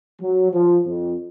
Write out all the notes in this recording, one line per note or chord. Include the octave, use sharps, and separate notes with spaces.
F#3
F3
F2